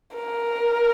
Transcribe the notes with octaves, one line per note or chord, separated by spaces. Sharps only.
A#4